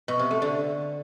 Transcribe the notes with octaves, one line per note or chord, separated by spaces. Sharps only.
B2
C3
A3
D3